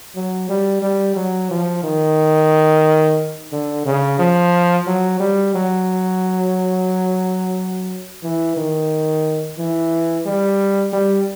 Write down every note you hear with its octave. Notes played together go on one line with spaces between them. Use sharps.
F#3
G3
G3
F#3
F3
D#3
D3
C#3
F3
F#3
G3
F#3
E3
D#3
E3
G3
G3